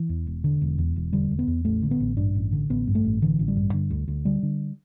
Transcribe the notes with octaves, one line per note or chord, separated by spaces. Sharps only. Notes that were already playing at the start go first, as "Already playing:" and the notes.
Already playing: E3
E2
E1
D3
E1
E2
E1
D3 G3
E1
B3
E2
A1 A3
D3
B3
A1
G2 D4
A1
D3
A1 B3
G2
A3
A1
D3 E3
A1
G3
G2
D3
D2
D2
D3 G3
D3